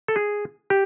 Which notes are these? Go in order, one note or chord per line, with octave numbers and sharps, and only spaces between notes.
A4
G#4
G4